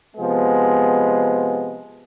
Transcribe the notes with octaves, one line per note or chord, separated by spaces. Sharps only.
C3 F3 G#3 B3